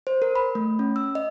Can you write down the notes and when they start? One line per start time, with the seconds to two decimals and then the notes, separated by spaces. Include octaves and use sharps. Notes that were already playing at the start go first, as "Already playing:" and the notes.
0.07 C5
0.22 A#4
0.35 B5
0.55 A3
0.79 C#4
0.96 E6
1.15 D#5